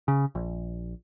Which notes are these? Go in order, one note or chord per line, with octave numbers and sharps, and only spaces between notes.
C#3
A#1